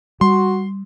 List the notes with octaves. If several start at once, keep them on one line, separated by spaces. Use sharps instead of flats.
G3 F#4 C6